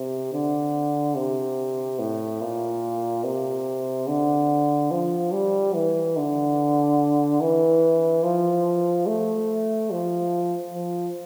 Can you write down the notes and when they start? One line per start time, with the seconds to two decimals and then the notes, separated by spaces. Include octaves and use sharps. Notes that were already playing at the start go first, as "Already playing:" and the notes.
Already playing: C3
0.33 D3
1.16 C3
1.99 A2
2.41 A#2
3.24 C3
4.08 D3
4.91 F3
5.32 G3
5.74 E3
6.17 D3
7.41 E3
8.23 F3
9.07 A3
9.91 F3
10.74 F3